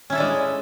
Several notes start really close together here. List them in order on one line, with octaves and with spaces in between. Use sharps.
C#4 E4 A4 D4 G#3